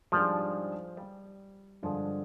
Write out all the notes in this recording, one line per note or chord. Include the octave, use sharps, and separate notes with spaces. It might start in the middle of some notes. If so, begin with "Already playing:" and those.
G#2 F3 G3 D4 G#4
G3
G2 D3 F3 G#3 D4 G#4